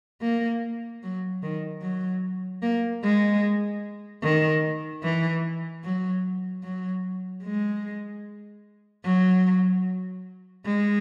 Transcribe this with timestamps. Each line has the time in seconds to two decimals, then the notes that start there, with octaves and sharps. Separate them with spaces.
0.21 A#3
1.02 F#3
1.43 D#3
1.82 F#3
2.62 A#3
3.03 G#3
4.23 D#3
5.03 E3
5.84 F#3
6.63 F#3
7.44 G#3
9.04 F#3
10.65 G#3